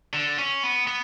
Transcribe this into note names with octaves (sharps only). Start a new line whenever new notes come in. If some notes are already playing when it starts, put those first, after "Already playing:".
D3
C#4
B3
B3